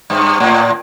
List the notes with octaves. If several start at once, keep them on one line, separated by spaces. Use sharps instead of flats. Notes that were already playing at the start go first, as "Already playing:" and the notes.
G2
A2